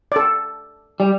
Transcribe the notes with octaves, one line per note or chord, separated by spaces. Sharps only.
A4 D5
G3